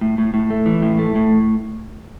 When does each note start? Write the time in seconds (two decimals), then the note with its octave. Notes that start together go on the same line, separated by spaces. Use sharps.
0.01 A2
0.18 A2
0.34 A2
0.50 A3
0.66 E3
0.82 A2
0.99 A3
1.15 A2